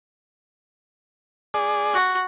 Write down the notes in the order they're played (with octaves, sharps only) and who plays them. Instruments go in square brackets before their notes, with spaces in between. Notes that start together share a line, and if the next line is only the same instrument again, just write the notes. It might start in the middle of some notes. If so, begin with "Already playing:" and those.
[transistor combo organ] G#4 D5
[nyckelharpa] F#4